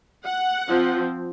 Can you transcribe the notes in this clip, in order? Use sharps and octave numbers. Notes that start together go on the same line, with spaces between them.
F#5
F3 C4